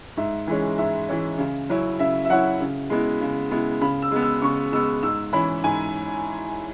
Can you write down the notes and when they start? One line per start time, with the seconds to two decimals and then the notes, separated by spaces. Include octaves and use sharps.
0.17 G#2 E5
0.47 E3 G#3 C#4
0.78 G#2 E5
1.09 E3 G#3 C#4
1.38 C#3
1.70 F#3 C#4 E4
1.99 C#3 E5
2.25 E5
2.30 F#3 C#4 E4 F#5
2.60 C#3
2.90 G#3 B3 E4
3.21 C#3
3.51 G#3 B3 E4
3.81 C#3 B5
4.02 E6
4.11 G#3 B3
4.22 E6
4.42 C#3 C#6
4.72 G#3 B3 E6
5.03 G#2 E6
5.33 E3 C#4 E4 B5
5.64 G#2 G#5